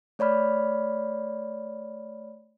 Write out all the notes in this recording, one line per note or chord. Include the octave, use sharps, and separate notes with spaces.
A3 C#5 D5 B5 F6